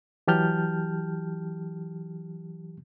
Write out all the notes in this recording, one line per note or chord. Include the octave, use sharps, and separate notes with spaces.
E3 F#3 G4 A5 F6 G6